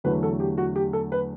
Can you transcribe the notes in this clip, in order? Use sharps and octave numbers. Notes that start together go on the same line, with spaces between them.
E2 D3 F#3 A3 B4
A4
G4
F#4
G4
A4
B4